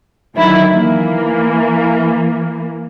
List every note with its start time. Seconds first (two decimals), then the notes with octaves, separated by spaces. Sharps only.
0.36 D3 D#3 F#3 E4
0.71 E3 A#3